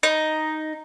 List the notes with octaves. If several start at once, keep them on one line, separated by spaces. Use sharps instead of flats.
D#4